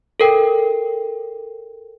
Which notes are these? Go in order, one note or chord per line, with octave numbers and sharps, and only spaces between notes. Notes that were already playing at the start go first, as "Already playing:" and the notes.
A4 A#4 G5